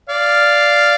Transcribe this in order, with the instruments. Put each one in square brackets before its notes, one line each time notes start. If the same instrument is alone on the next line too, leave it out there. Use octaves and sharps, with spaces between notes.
[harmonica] D5 F5